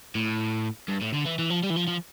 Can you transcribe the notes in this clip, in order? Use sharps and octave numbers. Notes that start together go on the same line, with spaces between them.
A2
G2
A2
D3
E3
E3
F3
G3
E3
F3
F3